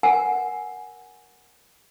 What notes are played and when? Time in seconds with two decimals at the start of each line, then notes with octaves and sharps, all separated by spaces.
0.03 A#4 F#5 G#5